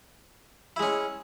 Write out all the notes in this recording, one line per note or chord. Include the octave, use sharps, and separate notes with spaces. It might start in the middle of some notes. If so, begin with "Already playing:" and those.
G#3 C#4 E4